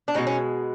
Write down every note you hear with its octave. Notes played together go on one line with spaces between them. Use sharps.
D4
B2 G#3 C#4 D#4
C#4